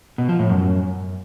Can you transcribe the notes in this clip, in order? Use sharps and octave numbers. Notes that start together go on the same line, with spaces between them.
B2
F3
A2
F#2